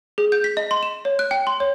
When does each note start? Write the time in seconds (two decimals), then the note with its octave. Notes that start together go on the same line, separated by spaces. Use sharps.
0.18 G#4
0.32 G6
0.44 B6
0.57 D#5
0.71 C6
0.83 E7
1.05 C#5
1.19 F#6
1.31 G5
1.47 C6
1.60 C#5